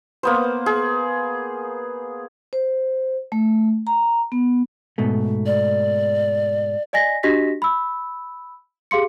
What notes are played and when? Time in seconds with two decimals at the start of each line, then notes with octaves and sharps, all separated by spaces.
0.23 A#3 B3 C5
0.66 G#4
2.53 C5
3.32 A3
3.87 A#5
4.32 B3
4.98 G#2 B2 A3
5.46 D5
6.93 D5 D#5 G#5 A#6 B6
7.23 D4 F#4 G4 D#5 A#6 B6
7.62 B5 E6
8.91 G4 G#4 F5 C6 C#7